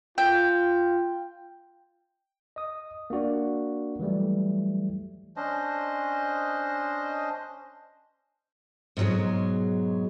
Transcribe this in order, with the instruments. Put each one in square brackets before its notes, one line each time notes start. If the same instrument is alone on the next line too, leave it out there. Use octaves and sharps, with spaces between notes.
[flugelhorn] F4 [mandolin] G5
[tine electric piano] D#5 D#6
A#3 D4 F#4 D5
E3 F#3 G3 A3
[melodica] C#4 D4 C5 D#5
[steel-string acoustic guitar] G#2 B2 F3 F#3 G#3